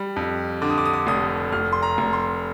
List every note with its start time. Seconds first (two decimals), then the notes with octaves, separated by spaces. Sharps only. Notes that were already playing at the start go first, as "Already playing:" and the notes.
Already playing: G3
0.16 F2
0.62 D3 D6
0.70 D#6
0.78 D6
0.86 D#6
0.93 D6
1.07 F1 D#6
1.52 F1 F6
1.73 C6
1.82 A#5
1.98 F1
2.13 C6